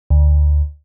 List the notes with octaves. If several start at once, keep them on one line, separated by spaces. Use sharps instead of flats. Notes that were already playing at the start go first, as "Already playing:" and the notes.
D2